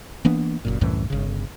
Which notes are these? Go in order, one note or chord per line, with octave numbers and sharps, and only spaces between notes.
E3 A#3 B3 D4
F#1 F#2 A#2
C2 F#2 A2 E3
G1 C#3